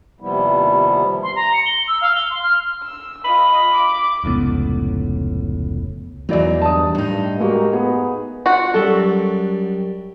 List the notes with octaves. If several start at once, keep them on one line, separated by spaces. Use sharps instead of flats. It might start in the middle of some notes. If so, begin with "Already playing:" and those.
D#2 C3 F3 G3 B3 E4
C6
A#5
C#7
G7
E6
F5
G7
C6
F6
E6
F4 D#5 B5
D6
F1 C#2 A2 B3
E2 F#3 D#4 E4 D5
G2 A5 D#6
A2 D#4
G#3 A#3 F#4 G4
B3 G#4
F4 F#4 F#5
F#2 G3 A4